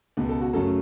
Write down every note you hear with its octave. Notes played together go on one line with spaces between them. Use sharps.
C#2 B2 B3
A4
F#4
F#2 C#3 F#3 A3 A4